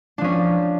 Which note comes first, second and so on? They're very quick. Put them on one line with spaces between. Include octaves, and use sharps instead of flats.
D4 F3 C#4